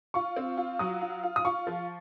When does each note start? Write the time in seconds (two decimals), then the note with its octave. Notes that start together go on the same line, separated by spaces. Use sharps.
0.14 F4 C#6
0.36 C4
0.57 F4
0.79 F#3 D#6
1.01 F4
1.23 F4
1.36 D#6
1.45 F4 C#6
1.67 F3